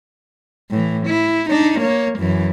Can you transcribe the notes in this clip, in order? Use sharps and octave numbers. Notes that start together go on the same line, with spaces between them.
A2 E3
E4
D4 D#4
A#3 C#5
F#2 E3